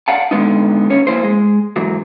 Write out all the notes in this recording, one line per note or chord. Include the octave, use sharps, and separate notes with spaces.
D5 F5 F#5 A5
D3 D#3 G#3 B3 D#4
D#2 C#4 C#5
F3 A#3 E4 C5
G#3
G#2 E3 F#3